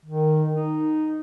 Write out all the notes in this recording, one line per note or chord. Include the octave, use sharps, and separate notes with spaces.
D#3
D#4